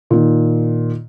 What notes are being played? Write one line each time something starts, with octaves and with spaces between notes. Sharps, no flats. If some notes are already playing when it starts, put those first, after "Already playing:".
A#2 D#3